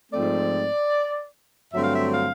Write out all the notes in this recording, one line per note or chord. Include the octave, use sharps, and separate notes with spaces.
G#2 F3 A3 C4 D5
G2 D3 F#3 A3 C4 E5
F5
E5
F5